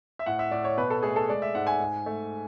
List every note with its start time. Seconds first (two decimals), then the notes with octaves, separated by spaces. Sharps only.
0.19 E5
0.26 A2 F#5
0.39 E5
0.51 A2 D5
0.64 C#5
0.77 B2 B4
0.90 A4
1.03 A3 G#4
1.16 A4
1.29 G#3 D5
1.42 E5
1.55 G#2 F#5
1.67 G#5
1.80 G#2
2.06 A3